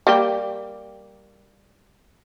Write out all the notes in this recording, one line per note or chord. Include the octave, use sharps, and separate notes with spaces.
G3 A#3 G4